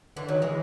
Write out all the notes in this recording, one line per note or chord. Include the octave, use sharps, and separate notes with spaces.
D3 E3
D#3 F#3
E3 G#3